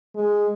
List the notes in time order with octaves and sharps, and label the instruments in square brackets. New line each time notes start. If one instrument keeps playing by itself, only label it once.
[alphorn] G#3